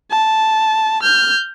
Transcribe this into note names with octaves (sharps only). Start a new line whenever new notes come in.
A5
F6 G6